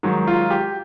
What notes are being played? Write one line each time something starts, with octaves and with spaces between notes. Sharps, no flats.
G#2 D#3 F#3
F4
G4